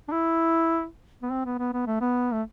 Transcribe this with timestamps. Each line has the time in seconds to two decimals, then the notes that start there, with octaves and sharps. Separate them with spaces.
0.09 D4
0.12 E4
1.22 B3
1.31 C4
1.45 B3
1.59 B3
1.73 B3
1.87 A3
2.01 B3
2.33 A3